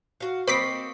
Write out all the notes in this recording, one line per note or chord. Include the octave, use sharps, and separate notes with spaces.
F#4 F5
A#3 C4 D#5 B5 C#6 D6 B6 C7